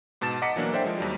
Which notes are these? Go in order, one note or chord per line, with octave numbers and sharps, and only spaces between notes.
G#2 B2 A5 A6 E7
D#5 F#5 A#5 D6 B6 C#7
E3 F#3 A#3 D4
A4 A#4 C5 D5 E5 G5
F3 G#3
D#2 F#3 G3